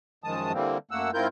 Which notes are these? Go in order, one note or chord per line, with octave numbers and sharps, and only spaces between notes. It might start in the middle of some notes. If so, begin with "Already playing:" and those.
F#2 D#3 F3 G#3 A5 D#6
D3 E3 G3 A#3 C4
F#2 A3 A#3 F#5 E6
G#2 C4 E4 F4 A#4 G6